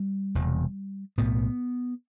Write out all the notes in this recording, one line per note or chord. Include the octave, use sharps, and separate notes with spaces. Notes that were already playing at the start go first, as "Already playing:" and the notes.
Already playing: G3
E1 E2 C3
B1 A2 B3